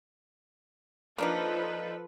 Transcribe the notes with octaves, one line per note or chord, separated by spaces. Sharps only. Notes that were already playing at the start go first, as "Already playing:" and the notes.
F3 A#3 D4 D#4 A4 B4